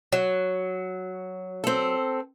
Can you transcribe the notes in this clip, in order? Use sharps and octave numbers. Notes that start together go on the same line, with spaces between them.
F#3
C4 A4